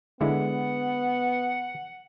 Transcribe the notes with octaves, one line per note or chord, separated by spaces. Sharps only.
D3 G#3 B3 E4 F#5